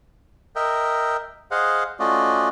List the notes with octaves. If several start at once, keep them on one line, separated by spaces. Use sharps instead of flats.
A#4 D#5 E5 G5
G#4 C5 D#5 F5 F#5
A3 C#4 F4 F#4 D5 D#5